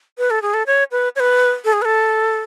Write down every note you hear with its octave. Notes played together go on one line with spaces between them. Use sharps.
B4
A4
G#4
A4
C#5
B4
C#5
B4
A4
G#4
B4
A4